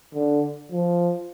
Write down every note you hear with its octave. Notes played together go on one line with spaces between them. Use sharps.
D3
F3